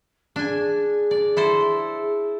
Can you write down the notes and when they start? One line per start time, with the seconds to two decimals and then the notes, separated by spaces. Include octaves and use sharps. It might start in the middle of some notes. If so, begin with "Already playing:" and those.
0.36 D4 G#4 G#5
1.11 D5
1.37 E4 A4 C5